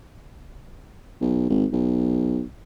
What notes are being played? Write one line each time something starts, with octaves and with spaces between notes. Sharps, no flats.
B1
G#1
B1